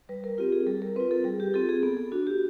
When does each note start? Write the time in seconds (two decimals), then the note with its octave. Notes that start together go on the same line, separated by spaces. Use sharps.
0.09 G3 B4
0.24 A#4
0.38 C4 F4 G4
0.52 G#4
0.67 G3 A4
0.82 A#4
0.96 C4 F4 B4
1.11 A4
1.24 G3 G#4
1.40 G4
1.53 C4 F4 A4
1.69 G#4
1.83 B3 A4
1.97 A4
2.12 D4 F#4
2.27 G4